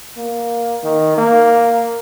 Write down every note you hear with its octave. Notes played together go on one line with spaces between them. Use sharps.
A#3
D#3
A#3